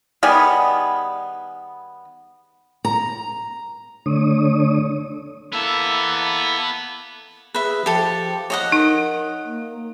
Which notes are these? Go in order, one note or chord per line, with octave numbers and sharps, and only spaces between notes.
D#3 G3 B3 G#4
A#5
D3 A3 D4 C#5 D#6
A#3 B3 E4 A4 E5
G#4 B4 E5
F3 G4 A4
C#5 D#5 F#5
D#4 A#4
A#3